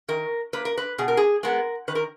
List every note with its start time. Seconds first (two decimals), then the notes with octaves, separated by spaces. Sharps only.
0.08 D#3 A#4
0.53 A#3 B4
0.65 A#4
0.78 B4
0.98 B2 G#4
1.08 A#4
1.17 G#4
1.43 G#3 B3 A#4
1.88 D#3 B4
1.95 A#4